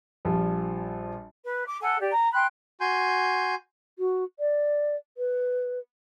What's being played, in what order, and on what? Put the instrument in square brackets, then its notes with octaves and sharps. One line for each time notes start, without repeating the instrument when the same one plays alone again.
[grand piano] A#1 F3 G3
[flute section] B4
D6
A4 F#5 G#5
G4 D5
A#5
G5 B5 C6 F#6
[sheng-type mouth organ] F#4 G#5 C6 G6
[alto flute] F#4
D5
B4